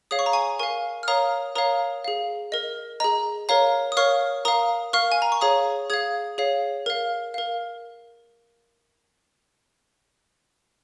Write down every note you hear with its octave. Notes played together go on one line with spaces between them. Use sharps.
G#4 C#5 F5 D#6
C#6
A#5
G#5 C#6
A#4 F5 G#5 C#6
F6
A#4 C#5 F5 A#5 D#6
A#4 C#5 F5 A#5 D#6
G#4 F5
A#4 D#5
G#4 D#5 A#5
A#4 C#5 F5 A#5
D#6
A#4 C#5 F5 C#6 F6
A#4 F5 A#5 D#6
A#4 F5 C#6 F6
G#5
A#5
C#6
G#4 C#5 F5 A#5 D#6
G#4 F5 D#6 G#6
G#4 C#5 F5
A#4 F5
A#4 F5